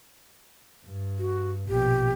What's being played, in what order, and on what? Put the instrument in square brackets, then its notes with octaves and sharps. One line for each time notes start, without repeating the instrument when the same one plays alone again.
[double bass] G2
[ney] F#4
[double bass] A#1 B2 [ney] G4